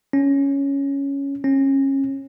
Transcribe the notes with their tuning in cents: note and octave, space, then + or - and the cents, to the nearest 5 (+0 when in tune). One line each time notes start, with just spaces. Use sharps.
C#4 +5
C#4 -25